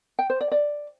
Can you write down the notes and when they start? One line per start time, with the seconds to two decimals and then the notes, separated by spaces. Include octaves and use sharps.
0.19 G5
0.30 C5
0.41 D5
0.51 D5